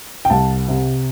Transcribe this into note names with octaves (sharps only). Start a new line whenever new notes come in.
G5
C2 A5
C3